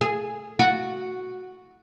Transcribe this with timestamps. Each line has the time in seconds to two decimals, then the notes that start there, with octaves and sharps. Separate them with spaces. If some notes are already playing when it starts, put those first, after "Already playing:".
0.01 G#4
0.59 F#4